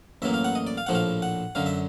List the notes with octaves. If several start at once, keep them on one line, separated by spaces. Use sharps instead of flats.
A1 A2 F#3 A#3 E5
F5
F#5
D#5
D5
F5
A#1 A2 F3 A3 F#5
F5
F#5
F#2 D3 F#3 F5
E5